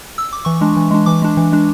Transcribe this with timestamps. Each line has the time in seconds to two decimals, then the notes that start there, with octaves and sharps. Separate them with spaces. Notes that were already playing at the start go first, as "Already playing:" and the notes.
0.18 E6
0.33 D6
0.45 E3 C#6
0.61 G#3 D4
0.76 E3
0.91 G#3 D4
1.06 E3 D6
1.22 G#3 D4
1.37 E3
1.52 G#3 D4